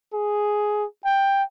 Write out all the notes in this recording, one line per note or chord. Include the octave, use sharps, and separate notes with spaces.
G#4
G5